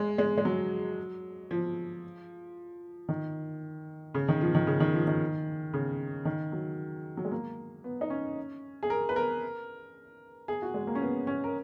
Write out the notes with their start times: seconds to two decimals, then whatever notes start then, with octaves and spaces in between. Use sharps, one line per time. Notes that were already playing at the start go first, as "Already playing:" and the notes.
Already playing: G#3
0.18 G#3
0.38 G#3
0.45 F#3
1.51 F3
3.09 D#3
4.14 C#3
4.28 D#3
4.41 F3
4.55 D#3
4.67 C#3
4.80 D#3
4.94 F3
5.07 D#3
5.73 C#3
6.25 D#3
6.52 F#3
7.17 F#3
7.25 G#3
7.31 A#3
7.84 B3
8.01 D#4
8.10 C#4
8.83 G#4
8.90 A#4
9.09 B4
9.16 A#4
10.48 G#4
10.62 F#4
10.74 G#3
10.87 A#3
10.95 C#4
11.02 B3
11.27 C#4
11.44 A#4